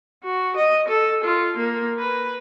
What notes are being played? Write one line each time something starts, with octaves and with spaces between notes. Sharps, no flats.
F#4
D#5
A4
F4
A#3
B4